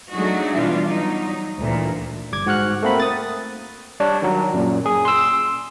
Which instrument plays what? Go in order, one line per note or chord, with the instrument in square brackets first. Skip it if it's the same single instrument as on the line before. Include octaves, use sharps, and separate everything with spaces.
[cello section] F#3 A3 D4 D#4 F#4 G#4
B2 E3 G3 D4 F4
F#3 D#4
D2 A#2 E3
[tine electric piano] G1 G3 D6 G#6
G#2 F#4 F#5 F6 F#6
A3 A#3 C4 A#4 F#5 B5
D#6 A6
G3 D4 C#5
D#3 F#3
F#2 A#2
G#4
C6 E6